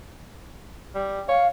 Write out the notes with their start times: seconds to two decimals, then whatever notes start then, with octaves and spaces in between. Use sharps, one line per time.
0.95 G3
1.28 C#5 F5